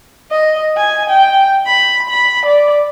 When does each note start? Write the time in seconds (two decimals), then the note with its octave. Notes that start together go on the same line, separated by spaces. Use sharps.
0.31 D#5
0.77 G#5
1.10 G5
1.67 B5
2.09 B5
2.45 D5